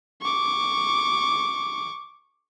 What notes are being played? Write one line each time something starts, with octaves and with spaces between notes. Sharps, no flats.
C#6 D6